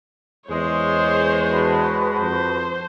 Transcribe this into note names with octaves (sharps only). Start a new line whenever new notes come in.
E2 G#3 C5 C#5
F#4 B4 A5
F2 C5